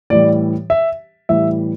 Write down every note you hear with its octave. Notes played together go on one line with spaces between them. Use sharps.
A2 E3 G3 D5
E5
A2 E3 G3 E5